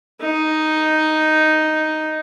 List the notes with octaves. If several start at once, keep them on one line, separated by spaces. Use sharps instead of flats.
D#4